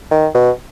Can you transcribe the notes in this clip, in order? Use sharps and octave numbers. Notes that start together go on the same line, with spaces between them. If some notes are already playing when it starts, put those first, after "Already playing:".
D#3
B2